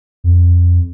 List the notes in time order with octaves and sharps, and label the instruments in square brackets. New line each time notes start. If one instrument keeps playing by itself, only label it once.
[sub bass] F2